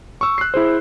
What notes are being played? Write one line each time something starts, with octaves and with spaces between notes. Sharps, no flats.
C#6 E6
F#6 C7
E4 G#4 C5